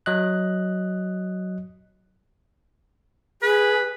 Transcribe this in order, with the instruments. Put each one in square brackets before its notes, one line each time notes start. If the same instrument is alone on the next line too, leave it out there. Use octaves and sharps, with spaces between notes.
[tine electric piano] F#3 D#5 F#6
[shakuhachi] G#4 [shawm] B4